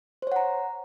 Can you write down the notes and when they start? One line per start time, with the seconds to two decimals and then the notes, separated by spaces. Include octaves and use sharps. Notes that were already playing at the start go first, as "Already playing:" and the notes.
0.22 C5
0.27 C#5
0.32 F#5
0.36 A#5